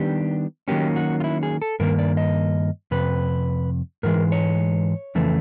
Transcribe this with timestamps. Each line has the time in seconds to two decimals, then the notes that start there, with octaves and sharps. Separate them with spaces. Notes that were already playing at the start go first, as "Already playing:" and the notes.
Already playing: D#3 G3 B3 D4 G4
0.68 D#3 F#3 A#3 C#4 G4
0.96 F#4
1.20 F4
1.24 E4
1.43 G#4
1.62 A4
1.80 G2 D#3 A#3 A#4
1.99 D5
2.17 D#5
2.91 F2 C3 B4
4.03 G#2 E3 G#3 A#4
4.32 C#5
5.15 F2 C#3 E3 A3